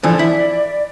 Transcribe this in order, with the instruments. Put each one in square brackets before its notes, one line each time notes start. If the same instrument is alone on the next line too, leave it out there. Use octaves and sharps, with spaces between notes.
[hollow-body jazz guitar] D3 E3 F3 [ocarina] D5
[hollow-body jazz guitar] E4